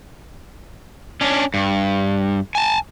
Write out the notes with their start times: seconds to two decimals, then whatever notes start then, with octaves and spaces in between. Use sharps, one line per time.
1.21 C#4 D4
1.54 G2
2.55 G#5 A5